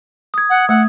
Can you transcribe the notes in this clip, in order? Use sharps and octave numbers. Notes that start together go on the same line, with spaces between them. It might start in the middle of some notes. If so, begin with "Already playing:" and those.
D#6 G#6
F#5
A3 F#5